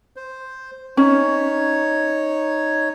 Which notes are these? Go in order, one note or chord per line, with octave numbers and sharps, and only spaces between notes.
C5
C#4 D#4 C#5